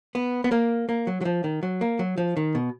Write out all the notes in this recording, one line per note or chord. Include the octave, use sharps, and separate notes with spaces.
B3
B3
A#3
A#3
F#3
F#3
F3
D#3
F#3
A#3
F#3
F3
D#3
B2